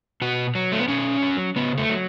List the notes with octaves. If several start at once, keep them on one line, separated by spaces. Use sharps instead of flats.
B2 F#4
F#3
A3
B3
B2 C#4
F#3
C#3 B3
A3
F#3